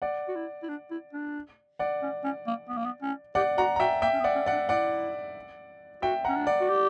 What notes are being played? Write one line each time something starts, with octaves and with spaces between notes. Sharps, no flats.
D5 F#5
F#4
E4
E4
D4
E4
D4
D5 F#5
C#4
C#4
A#3
B3
A#3
B3
C#4
G4 D5 F#5
F#4 F#5 A#5
A#5
F#4 E5 G5
A#3 E5 G5
C#4
B3
D5 F#5
C#4
D5 F#5
D4
E4 D5 F#5
F#4 E5 G5
C#4 F#5 A#5
D4
D5 F#5
F#4
G4